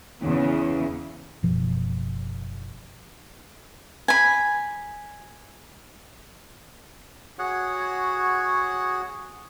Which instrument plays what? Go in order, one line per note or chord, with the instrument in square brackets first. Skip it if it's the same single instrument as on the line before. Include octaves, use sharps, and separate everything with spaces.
[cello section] E2 C#3
[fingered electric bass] F#1 B2 F3
[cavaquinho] G#5 B5
[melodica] F#4 G#4 C#5 F#5